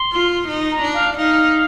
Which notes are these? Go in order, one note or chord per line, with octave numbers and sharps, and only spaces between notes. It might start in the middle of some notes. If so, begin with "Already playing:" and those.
Already playing: C6
F4
D#4
A#5
D4
F5
D#4 F5